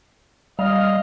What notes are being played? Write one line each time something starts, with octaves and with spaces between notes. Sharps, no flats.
G3 D#5 F5